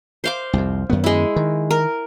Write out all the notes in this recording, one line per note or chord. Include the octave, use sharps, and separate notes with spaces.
C5 F5 D6
C2 F2
F#2 D#3 B3
G#3 E4
D#3
A#4